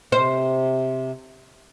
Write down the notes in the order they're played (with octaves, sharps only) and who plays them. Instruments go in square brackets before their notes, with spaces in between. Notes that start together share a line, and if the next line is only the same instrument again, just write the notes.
[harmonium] C3 [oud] C5